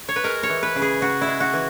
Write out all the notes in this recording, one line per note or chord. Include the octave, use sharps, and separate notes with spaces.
C#5
B4
G#3 A#4
C#5
E3
B4
C#3
G#4
C#3 F#4
E4
G#3
F#4
E3